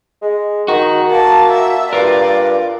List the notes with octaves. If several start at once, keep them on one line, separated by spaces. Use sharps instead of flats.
G#3
D#3 F#4
A#3 A5
E5
G2 F4 A#4 D5